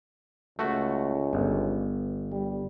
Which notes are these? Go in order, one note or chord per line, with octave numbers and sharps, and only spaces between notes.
C#2 A3 F#4
G1
G3